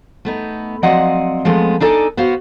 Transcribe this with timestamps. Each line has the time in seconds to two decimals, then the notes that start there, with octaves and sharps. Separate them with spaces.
0.25 A3 B3 D#4
0.83 F3 F#3 C4 D5 D#5 F#5
1.45 F3 G#3 A3 B3 C4
1.80 D4 D#4 A4 D5 G5 G#5
2.17 B3 F#4 C5 F5